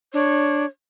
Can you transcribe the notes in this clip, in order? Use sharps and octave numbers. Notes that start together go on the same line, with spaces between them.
D4 C#5